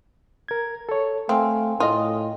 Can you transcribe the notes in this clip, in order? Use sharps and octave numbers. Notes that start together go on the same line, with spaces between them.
A#4 G#6
A4 C#5
A3 C4 F5 G5 G#5
A2 F4 D#5 D#6